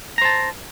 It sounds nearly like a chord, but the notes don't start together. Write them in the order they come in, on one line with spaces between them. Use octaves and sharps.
A#5 C5 A5